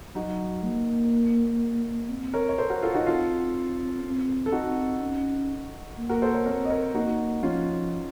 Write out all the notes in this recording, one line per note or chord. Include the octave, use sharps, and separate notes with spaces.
F#3 D#4 F#4
A#3
C4
A#4 C#5
C#5
A4 C5
F#4 A#4
F4 A4
D#4 F#4
C4 F4 A4
C4
A4
C4 D#4 F#4
C#4
A#3
F#4 A#4
A4 C5
A#4 C#5
C4 A#4 C#5
D#5
A#4 C#5
A#3 D#4 F#4
F3 C#4 F4